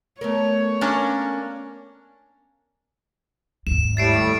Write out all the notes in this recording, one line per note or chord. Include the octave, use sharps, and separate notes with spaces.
A3 B3 A#4 C#5
A#3 C#4 D4
D#2 G#2 E7
A2 G3 A3 A6 C7 D7